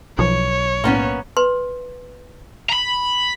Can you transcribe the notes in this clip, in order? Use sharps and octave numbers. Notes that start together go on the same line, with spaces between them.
B1 F3 C#5
A2 A#3 B3 C#4
B4 C6
A#5 B5